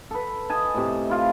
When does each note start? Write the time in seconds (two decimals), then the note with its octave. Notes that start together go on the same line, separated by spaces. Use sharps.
0.11 A4 B4
0.50 D#5 G#5 A5
0.74 A2 C3
1.09 E4 F4